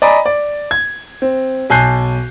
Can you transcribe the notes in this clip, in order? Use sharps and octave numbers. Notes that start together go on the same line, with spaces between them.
D5 D#5 G#5 A#5 B5
D5
G#6
C4
B1 G#5 A5 F#6 G6 C7